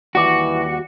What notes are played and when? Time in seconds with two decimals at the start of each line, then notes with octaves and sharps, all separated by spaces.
0.15 D#2 E3 G3 F#4 D5